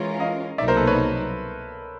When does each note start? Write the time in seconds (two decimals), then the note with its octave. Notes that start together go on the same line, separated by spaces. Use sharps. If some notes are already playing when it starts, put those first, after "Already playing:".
Already playing: E3 G#3 C#4 F4 A#4
0.20 D#5 F5
0.58 C2 B2 F#3 A#3 D#4 D5 E5
0.68 A#4 C5
0.77 A4 B4
0.87 B4 C#5